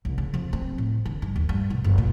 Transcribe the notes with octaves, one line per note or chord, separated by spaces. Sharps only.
C2
C#3
F2
C4
A2
D3
G2
D#2
G2
B1
F#1
A#2